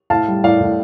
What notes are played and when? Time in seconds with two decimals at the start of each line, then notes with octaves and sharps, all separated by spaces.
0.10 A2 F5 A5
0.27 G3
0.44 A2 D5 F5
0.61 A2